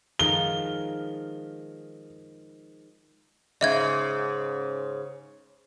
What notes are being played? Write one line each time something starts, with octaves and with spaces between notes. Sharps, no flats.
D#3 F3 G#3 G7
G#2 C#3 D#5 E5 G#6